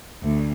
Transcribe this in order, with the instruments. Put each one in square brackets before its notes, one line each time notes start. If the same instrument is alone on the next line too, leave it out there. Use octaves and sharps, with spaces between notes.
[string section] D2